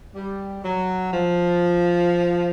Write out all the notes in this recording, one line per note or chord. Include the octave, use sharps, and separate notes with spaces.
G3
F#3
F3